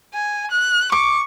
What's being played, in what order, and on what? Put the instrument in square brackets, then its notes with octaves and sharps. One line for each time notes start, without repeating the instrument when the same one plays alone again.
[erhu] G#5
F#6
[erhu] C#6 [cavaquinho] D6